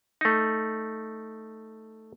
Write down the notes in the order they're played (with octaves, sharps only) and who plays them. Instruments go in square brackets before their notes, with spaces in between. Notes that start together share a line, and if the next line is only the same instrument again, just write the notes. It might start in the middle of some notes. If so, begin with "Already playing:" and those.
[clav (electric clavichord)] A3 D#4